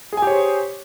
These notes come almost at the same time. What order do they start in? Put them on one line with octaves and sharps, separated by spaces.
G#4 G#5 G4 C#5 C5